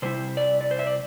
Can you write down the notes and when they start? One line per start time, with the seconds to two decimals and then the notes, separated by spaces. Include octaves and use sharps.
0.02 C3 G3 E4 C5
0.37 D5
0.61 D5
0.71 C5
0.79 E5
0.87 D5